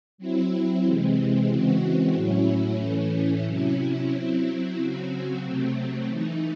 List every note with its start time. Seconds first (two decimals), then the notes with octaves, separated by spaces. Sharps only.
0.18 F#3 C4 E4
0.84 C3 E3 G#3 C4
1.49 C#3 E3 G#3 C4 F#4
2.14 A2 F#3 C#4 E4
2.80 A2 E3 A3 C#4
3.45 C3 F#3 C#4 E4
4.10 F#3 C4 E4
4.76 C#3 F#3 C4 F#4
5.41 C3 F#3 A3 C4
6.06 E3 A3 D#4